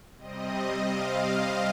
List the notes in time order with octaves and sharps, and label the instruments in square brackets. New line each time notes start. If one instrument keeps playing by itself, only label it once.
[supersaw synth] C3 G3 C4 D#5
F5